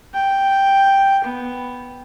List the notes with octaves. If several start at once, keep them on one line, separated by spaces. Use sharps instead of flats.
G5
B3